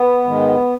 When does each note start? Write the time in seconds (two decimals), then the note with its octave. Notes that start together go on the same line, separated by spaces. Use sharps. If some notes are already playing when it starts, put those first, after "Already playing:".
Already playing: B3
0.24 G#2 D#3 G#3